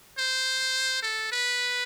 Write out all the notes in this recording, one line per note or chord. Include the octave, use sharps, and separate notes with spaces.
C5
A4
B4